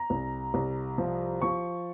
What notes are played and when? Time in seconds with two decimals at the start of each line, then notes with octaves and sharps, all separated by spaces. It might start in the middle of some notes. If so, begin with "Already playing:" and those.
Already playing: A#5
0.10 C2
0.54 C2
0.98 F3
1.42 F3 C#6